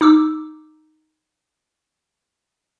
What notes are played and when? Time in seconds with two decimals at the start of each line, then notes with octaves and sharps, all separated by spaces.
0.01 D#4 D6 E6